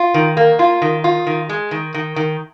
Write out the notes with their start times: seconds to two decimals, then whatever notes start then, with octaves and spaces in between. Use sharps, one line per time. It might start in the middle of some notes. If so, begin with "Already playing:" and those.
Already playing: F4
0.14 D#3
0.37 A#3
0.59 F4
0.82 D#3
1.04 F4
1.27 D#3
1.49 G#3
1.71 D#3
1.94 D#3
2.16 D#3